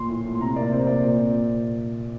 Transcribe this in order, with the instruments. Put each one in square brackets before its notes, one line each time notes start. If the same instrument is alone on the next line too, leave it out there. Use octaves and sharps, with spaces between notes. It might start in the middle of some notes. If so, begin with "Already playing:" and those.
Already playing: [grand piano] A#2 C6
A2
A3
C6
C3 A#5
A#3 D5
C3 C5
A#3 D5
A#2